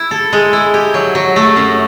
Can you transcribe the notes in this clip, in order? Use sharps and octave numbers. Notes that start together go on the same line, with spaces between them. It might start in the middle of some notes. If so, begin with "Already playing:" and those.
Already playing: E4
A4
G#3
E4
G4
F#3
F#3
A3
F#2